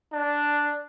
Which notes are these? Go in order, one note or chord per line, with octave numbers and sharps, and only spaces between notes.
D4